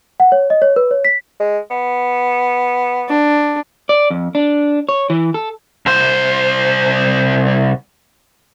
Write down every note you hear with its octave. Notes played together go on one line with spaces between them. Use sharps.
F#5
C#5
D#5
C#5
B4
C#5
B6
G#3
B3
D4
D5
F2
D4
C#5
E3
A4
C2 C5